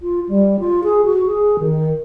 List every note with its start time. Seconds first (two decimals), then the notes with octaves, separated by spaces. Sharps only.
0.01 F4
0.29 G3
0.60 F4
0.84 G#4
1.05 F#4
1.26 G#4
1.60 D#3